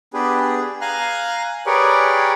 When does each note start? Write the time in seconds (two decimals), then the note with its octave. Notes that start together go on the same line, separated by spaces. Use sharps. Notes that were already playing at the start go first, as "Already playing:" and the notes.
0.14 B3 D4 G4 G#4 B4
0.81 F5 G#5 A#5 F6 F#6
1.66 G4 G#4 A#4 B4 C#5 D5